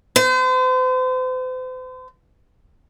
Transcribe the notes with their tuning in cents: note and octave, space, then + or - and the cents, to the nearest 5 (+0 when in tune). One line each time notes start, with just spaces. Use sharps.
C5 -40